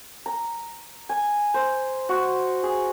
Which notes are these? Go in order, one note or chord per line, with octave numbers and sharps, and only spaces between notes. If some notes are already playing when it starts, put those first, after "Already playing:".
A#5
G#5
C5
F#4
G#4